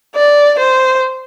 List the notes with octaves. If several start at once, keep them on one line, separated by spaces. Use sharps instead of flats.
D5
C5